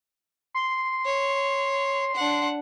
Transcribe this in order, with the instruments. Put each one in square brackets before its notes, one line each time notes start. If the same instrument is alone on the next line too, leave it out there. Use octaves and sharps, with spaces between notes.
[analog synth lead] C6
[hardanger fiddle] C#5
D4 F#5